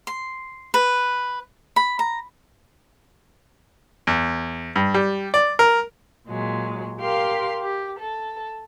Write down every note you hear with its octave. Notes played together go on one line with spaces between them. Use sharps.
C6
B4
B5
A#5
E2
G2
G3
D5
A#4
A#2 F#3 G#3
G4 A#4 F5 C6
G4
A4